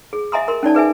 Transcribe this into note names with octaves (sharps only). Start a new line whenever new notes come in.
G#4
D#5 E5 G#5 A#5 C6 D#6
A#4 C6
C#4 D#4 D5 A5
G#4 B4 E5 G#5